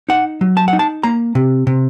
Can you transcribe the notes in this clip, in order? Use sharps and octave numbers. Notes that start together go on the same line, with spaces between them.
D#4 F#5
F#3
A5
F#5
D#4
A5
A#3 A#5
C3
C3